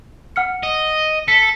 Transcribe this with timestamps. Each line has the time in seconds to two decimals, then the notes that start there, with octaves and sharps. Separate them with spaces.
0.36 F#5 F6 C#7
0.63 D#5
1.28 A4 B6 C#7